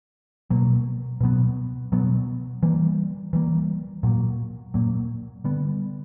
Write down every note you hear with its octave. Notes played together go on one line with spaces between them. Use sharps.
B2 F#3 A#3
B2 F#3 B3
B2 F#3 B3
E3 G3 A#3
E3 G3 A#3
A#2 F#3 A#3
A#2 F#3 A#3
D3 G3 B3